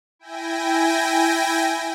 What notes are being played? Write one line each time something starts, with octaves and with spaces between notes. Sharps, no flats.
E4 G5 G#5 A#6